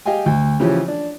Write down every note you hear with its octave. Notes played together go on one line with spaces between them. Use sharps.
G4 D#5 F5 G5 G#5
D2
C#3 E3 F3 C#4 G4
D4